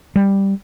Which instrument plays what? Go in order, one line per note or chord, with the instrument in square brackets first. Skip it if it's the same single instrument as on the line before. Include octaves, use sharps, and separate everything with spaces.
[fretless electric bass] G3